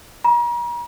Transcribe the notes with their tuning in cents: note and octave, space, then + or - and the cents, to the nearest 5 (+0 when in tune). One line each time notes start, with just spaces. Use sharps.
A#5 +40